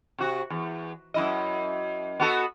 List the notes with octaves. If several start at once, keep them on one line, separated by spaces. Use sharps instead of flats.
C3 F#4
E2
F#2 E4 D#5
B3 F#4 A4